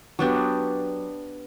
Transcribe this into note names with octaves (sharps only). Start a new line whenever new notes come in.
F#3 B3 D4 G4